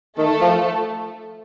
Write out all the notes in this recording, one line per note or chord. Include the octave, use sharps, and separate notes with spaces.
D#3 A3 A4
F3